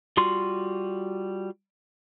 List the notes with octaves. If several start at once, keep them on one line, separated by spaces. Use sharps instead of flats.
G3 F4 F#4 C6